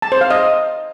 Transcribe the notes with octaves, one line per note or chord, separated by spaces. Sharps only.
A5
C5
F5
D#5